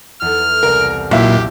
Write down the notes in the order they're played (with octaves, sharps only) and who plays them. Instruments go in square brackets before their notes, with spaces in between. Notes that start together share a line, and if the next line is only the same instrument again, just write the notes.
[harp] E2 A4 [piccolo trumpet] F6
[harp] C2 [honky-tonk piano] A#4
[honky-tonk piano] B1 E4 [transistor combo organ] A#2 [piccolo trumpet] G4